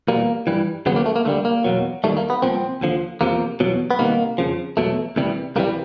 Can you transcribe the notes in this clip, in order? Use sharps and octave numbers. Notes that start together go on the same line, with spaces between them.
E2 B2 G3 A#3
G2 E3 G3
D#2 C#3 F#3 B3
A#3
A3
A#3
D2 D3 G3 A3
A#3
E2 B2 F#3
D#2 D#3 G3 A3
A#3
B3
C2 A#2 F3 C4
D#2 D3 F3
E2 C3 F3 A#3
E2 B2 F#3
B3
C2 C3 D#3 A#3
F2 C#3 F3
E2 B2 F#3 A3
D2 C3 E3 G3
C2 C3 E3 G3 A#3